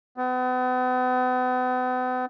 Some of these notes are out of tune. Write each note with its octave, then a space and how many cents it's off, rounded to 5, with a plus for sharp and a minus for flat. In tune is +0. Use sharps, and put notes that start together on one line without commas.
B3 +40